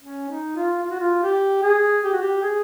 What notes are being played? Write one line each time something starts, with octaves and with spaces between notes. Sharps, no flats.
C#4
D#4
F4
F4
F#4
F4
G4
G#4
G4
F#4
G4
G#4